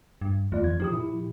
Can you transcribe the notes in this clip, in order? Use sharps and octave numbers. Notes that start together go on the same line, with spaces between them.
G2
E2 A3 F4 D5
F2 E3 G#6
F3 D#4 G4 D#6
A#2 E4 G4